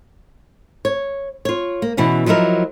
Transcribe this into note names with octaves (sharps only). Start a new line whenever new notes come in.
C#5
F4 C#5
A#3
B2 E3 B3 C#4
F3 F#3 D#4 E4 A#4